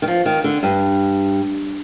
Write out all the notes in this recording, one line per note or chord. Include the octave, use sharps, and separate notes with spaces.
D#3
F3
D#3
D3
G2